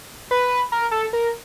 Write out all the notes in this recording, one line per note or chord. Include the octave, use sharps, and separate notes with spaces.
B4
A#4
A4
A#4